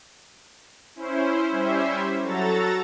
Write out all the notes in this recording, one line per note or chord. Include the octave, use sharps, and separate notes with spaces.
C#4 E4 C5
G3 C#4 E4 C5 E5
F#3 F#4 A4 A#5 A6